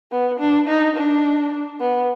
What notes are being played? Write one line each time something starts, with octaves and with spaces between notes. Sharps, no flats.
B3
D4
D#4
D4
B3